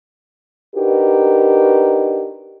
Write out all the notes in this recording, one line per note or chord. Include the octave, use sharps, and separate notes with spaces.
D4 D#4 F#4 G4 A#4 B4